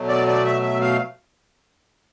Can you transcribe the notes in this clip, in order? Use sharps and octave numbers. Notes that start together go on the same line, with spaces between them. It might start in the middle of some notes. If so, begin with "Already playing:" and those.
Already playing: B2 F#3 A3
D5
D5
E5
E5
F5